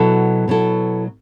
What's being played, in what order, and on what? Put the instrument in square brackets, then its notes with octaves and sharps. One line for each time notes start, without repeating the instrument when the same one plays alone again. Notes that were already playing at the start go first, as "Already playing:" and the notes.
Already playing: [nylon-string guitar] B2 F#3 B3 E4 A4
B2 F#3 B3 E4 A4